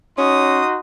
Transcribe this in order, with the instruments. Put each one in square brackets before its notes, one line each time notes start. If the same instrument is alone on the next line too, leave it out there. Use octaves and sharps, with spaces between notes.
[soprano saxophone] C#4 [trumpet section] D#4 F#4 C6 [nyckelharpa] D#6